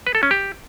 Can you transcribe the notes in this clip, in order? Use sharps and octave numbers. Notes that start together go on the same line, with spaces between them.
B4
A4
C#4
G4